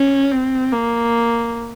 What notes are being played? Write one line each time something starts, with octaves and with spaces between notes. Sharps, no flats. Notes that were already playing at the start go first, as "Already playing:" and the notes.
Already playing: C#4
C4
A#3